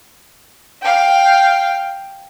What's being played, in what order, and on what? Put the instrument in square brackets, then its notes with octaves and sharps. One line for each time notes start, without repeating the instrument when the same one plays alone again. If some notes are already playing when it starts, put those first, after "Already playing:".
[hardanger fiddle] F5 G5